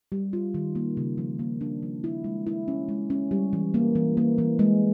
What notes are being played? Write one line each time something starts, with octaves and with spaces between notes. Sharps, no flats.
G3
F4
D#3
A#3
C#3
F3
A#3
D4
F3
E4
G#3
E4
C#4
G#3
C#4
G3
E3
A#3
E3
A#3
E3
G#3